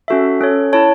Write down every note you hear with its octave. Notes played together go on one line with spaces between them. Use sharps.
C#4 F#4 A4 E5
C#4 A4 C#5
E4 C#5 A5